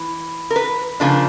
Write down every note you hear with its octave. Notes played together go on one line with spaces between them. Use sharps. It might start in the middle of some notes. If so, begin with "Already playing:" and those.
Already playing: E3
A#4
B4
C#3 F3 A#3 D4